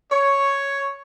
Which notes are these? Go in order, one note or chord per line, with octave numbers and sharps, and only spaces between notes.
C#5